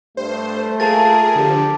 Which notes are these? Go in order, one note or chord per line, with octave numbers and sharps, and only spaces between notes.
G2 A3 C5
A#3 F4 G#4 A#4 A5 A6
D3 F3 G4